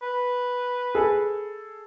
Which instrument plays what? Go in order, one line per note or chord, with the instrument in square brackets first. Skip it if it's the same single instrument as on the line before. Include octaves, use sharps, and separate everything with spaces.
[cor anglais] B4
[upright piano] G#4 A4